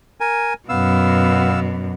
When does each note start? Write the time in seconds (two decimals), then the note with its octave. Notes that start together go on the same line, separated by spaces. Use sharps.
0.20 A#4 G#5
0.69 F#2 B2 B3 F5 E6